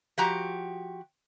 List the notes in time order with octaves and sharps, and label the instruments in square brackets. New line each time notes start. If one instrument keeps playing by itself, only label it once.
[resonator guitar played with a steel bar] F3 F#4 G4 A#5